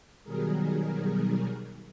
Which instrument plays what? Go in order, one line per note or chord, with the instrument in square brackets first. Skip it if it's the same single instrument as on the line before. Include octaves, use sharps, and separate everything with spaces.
[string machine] B2 D#3 F#3 G3 G#4 A#4